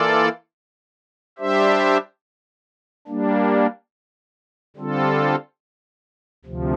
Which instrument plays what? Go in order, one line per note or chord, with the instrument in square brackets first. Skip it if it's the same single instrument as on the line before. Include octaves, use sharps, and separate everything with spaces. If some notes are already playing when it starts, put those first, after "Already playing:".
Already playing: [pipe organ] E3 A#3 F4 A4 D5
G3 D4 G4 C5 E5
G3 A#3 D4
D3 G3 C4 F4 A4
D2 C3 F3